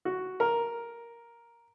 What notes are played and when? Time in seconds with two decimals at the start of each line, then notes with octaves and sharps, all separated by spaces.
0.05 F#4
0.40 A#4